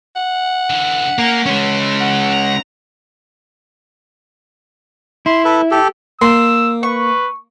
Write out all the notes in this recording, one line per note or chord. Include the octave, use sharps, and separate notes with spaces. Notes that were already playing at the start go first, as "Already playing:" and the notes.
F#5
D3 E3
A#3 C#4
E3 G#3 C#4
F#5
A#5
E4 C6
A4 B4
G4 A4
A#3 C6 E6
B4 C#6